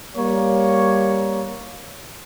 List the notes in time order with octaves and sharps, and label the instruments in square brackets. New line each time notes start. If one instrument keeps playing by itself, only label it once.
[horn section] G3 A#3 C#5